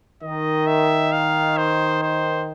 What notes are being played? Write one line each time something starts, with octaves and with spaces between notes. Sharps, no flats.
D#3 D#5
E5
F5
C5
C5